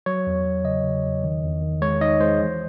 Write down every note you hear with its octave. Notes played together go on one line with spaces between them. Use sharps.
F#3 C#5
E2
E2
C#3 D#5
C#3
E2
D#3
E2
D#3
G#3 C#5
D#4 D#5
G#3 C5
E3